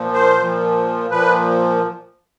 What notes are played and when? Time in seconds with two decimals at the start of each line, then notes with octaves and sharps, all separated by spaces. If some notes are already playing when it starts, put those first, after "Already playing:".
Already playing: A#2 F3
0.13 C5
0.38 A#2 F3
1.10 A#2 F3 B4